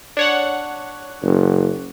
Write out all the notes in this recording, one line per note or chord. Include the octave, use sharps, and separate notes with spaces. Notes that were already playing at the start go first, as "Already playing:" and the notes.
D4 C#5 F#5
F#1